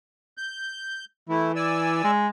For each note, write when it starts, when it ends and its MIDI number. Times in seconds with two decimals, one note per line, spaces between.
0.38 1.05 91
1.29 2.03 52
1.29 1.52 57
1.29 1.52 64
1.56 2.11 74
1.56 2.11 80
1.56 2.11 88
2.04 2.28 56